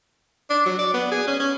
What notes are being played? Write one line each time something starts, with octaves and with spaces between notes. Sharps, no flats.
D4
F#3
D5
B3
G#4
C#4
C#4